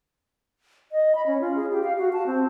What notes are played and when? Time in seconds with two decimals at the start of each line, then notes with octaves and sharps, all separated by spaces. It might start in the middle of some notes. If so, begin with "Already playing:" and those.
0.92 D#5
1.15 B5
1.26 C#4
1.41 F4
1.56 G#4
1.72 G4
1.84 F5
1.98 F#4
2.13 A5
2.26 C4